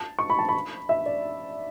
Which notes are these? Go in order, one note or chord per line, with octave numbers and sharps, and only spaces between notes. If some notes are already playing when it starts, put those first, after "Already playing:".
Already playing: A5
C#6
B5
A5
B5
E5
D5